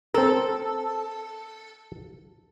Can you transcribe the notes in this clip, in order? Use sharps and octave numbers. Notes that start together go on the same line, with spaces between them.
C4 A4 A#4